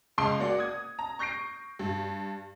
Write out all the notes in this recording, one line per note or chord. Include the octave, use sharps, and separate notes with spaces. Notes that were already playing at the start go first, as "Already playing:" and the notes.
C#2 G#3 C6 D7
A#3 F#4 D5 F#5
D#6 G#6
A#5
C#6 G6 A#6 C7 D7
G2